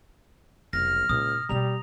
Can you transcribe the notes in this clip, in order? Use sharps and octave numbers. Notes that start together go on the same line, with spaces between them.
F1 B1 F6 A#6
C#2 A#2 E4 D#6
B2 G3 A#3 A#5 F7